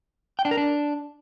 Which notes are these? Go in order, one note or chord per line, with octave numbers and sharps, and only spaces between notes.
G5
D4
A#4
D4